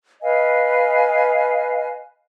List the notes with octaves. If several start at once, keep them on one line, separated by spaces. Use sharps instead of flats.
B4 D#5 F5 G#5